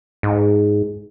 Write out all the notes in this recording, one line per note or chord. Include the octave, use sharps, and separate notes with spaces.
G#2